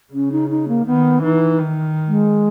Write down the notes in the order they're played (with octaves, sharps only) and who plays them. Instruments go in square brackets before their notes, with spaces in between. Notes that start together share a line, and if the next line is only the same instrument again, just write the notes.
[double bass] C#3 [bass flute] C#4
[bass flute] D#4
D#4
A#3
[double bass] D#3 [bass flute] B3
[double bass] E3 [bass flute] D#4
[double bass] D#3
[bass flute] G#3